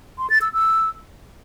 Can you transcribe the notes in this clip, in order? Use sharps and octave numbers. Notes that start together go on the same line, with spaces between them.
C6
A6
E6
E6